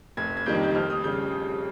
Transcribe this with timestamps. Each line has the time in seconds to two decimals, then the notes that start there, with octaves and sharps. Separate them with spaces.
0.17 F1 G#6
0.37 G#6
0.46 F2 D#3 G3 A#3 G6
0.63 G6
0.75 F2 F6
0.90 D#6
1.04 C#3 G3 G6